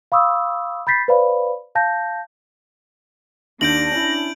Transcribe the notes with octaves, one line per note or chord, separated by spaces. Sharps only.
F5 B5 C#6 D#6 E6
B5 G6 A6 B6 C7
B4 C5 D5 F5 B5
F5 A5 G6 A#6
D#2 D4 G6 A#6 D7 F#7
C#4 E4